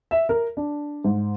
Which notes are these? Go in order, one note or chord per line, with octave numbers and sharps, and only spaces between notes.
E5
A#4
D4
G#2